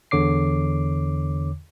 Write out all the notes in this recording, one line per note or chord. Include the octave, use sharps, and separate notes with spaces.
E2 D3 C#5 D6 C7